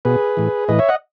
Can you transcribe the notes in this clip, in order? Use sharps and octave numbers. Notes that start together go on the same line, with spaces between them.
B2 G#4 B4
A2 E3
A2 E3 B4 D#5
C#5 E5
D#5 F#5